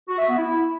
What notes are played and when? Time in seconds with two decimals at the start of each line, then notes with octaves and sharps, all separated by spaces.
0.08 F#4
0.18 E5
0.27 B3
0.37 E4